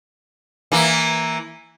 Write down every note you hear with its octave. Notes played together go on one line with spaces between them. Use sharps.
E3 A#3